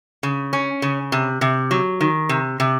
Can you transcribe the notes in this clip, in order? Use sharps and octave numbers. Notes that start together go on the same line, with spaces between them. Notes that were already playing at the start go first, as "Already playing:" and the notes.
C#3
C#4
C#3
C3
C3
F#3
D#3
C3
C3